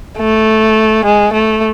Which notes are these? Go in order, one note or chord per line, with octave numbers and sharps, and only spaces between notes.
A3
G#3
A3